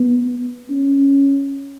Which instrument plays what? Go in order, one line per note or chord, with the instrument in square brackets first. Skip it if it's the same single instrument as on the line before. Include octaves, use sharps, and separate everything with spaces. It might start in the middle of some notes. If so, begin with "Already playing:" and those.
Already playing: [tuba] B3
C#4